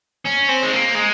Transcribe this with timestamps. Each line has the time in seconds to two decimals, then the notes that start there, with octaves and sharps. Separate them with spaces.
0.25 C#4
0.48 C4
0.63 G#3
0.72 A#3
0.95 G#3